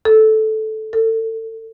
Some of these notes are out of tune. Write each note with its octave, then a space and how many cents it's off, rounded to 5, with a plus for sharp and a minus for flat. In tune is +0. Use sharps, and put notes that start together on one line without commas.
A4 -10
A4 +30